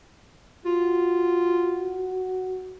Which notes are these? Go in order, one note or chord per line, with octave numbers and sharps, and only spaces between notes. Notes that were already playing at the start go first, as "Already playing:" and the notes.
F4 F#4